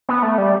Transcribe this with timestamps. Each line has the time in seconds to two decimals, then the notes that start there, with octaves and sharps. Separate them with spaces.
0.09 B3
0.23 A3
0.38 G3